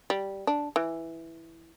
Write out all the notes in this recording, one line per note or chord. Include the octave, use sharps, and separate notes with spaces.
G3
D4
E3